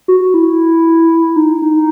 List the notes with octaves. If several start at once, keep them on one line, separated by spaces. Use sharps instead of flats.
F#4
E4
D#4
D#4